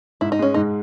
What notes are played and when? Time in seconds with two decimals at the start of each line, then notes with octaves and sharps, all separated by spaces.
0.21 G#2 E4
0.32 D#4
0.39 G#3 C#4
0.54 G#2 D#4